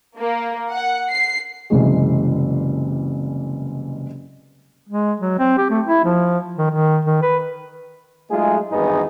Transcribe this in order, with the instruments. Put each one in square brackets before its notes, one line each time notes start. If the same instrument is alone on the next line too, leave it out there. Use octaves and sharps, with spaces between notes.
[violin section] A#3
F#5
C7
[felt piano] F#1 C2 E3 G#3
[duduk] G#3
F#3
C4
G4
A3
E4
F3
D#3
D#3
D#3
B4
[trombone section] F#3 G#3 A3 D#4 F4 G#4
G#1 E2 G2 B3 D#4 G#4